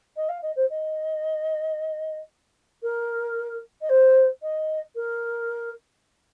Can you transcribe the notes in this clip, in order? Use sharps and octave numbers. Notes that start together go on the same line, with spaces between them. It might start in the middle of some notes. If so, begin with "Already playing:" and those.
D#5
F5
D#5
C5
D#5
A#4
D#5
C5
D#5
A#4